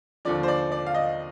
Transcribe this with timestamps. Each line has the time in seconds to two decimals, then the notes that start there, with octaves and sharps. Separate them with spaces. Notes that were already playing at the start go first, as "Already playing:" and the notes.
0.25 D#2 D3 F3 D5
0.43 C5
0.48 D5
0.72 D5
0.86 F5
0.94 D#5